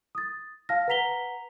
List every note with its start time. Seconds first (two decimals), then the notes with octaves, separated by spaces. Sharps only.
0.15 D#6 A6
0.69 F5 A5 F6 A#6
0.88 B4 F#5 A#5 B6 F7 G7